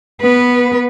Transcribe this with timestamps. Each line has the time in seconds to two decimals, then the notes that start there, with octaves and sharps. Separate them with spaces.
0.21 B3 B4